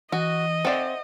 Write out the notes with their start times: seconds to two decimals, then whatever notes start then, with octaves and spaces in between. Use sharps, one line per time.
0.12 E3 F#4 D#5
0.65 C4 C5 D5 E5 F#5